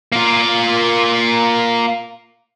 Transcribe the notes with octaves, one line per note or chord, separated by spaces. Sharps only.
A#3 F4